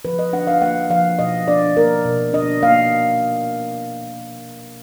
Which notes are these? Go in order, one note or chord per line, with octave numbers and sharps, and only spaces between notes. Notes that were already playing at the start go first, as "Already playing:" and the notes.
F3 B4
D#5
D4 F#5
F5
A#3 F#5
F3 F5
B2 D#5
D4 D5
A#3 A#4
B2
D4 D#5
A#3 F5